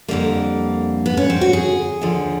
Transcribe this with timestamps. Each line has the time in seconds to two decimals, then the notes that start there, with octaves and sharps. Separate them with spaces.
0.08 F2 D3 G3 A#3
1.06 B3
1.17 C#4
1.30 C4
1.41 F#4
1.53 G#4
2.01 D#2 D3 F3